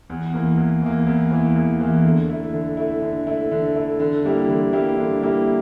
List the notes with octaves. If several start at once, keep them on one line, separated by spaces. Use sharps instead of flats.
E2
E3 A#3
E2
E3 A#3
E2
E3 A#3
E2
E3 A#3
D3
A3 E4
D3
A3 E4
D3
A3 E4
D3
A3 E4
D3
G3 A#3 E4 G4
D3
G3 A#3 E4 G4
D3
G3 A#3 E4 G4